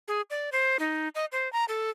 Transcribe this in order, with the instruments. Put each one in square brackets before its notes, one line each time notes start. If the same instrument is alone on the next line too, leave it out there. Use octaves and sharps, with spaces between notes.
[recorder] G#4
D5
C5
D#4
D#5
C5
A#5
A4